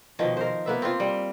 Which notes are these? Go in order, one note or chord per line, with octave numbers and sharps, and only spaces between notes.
B2 D#3 F3 D#5
A#4 C5
A#3 B3 E5
C4 F4
G3